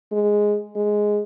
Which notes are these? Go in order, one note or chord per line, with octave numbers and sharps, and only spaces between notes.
G#3
G#3